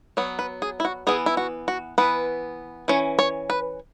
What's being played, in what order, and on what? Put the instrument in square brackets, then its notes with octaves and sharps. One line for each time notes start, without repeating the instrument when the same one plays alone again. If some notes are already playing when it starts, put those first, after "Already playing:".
[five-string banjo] F#3 B3 C#5
B4
G#4
E4
F#4
E3 B3 G#4
E4
F#4
F#4
E3 B3 B4
E3 C#4 C#5
C#5
B4